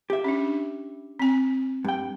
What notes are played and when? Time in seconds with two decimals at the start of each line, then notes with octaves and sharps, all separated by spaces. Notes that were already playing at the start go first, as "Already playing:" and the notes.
0.10 G4 E5
0.24 C#4 D4
1.20 C4 G#5
1.85 G2 G5